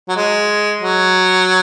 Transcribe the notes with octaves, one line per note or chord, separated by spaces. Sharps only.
F#3
G#3
F#3